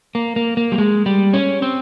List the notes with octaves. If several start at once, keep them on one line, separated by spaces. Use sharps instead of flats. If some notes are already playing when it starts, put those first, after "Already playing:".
A#3
A#3
A#3
G3
G#3
G3
C#4
C4